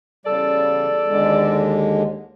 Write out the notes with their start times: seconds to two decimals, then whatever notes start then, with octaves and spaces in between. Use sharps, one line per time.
0.26 E2 C#3 G3 A4 D5
1.07 D#2 D3 G#3